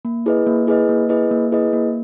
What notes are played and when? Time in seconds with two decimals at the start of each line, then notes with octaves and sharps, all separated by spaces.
0.05 A#3
0.26 E4 G#4 B4 D#5
0.47 A#3
0.67 E4 G#4 B4 D#5
0.89 A#3
1.09 E4 G#4 B4 D#5
1.31 A#3
1.52 E4 G#4 B4 D#5
1.73 A#3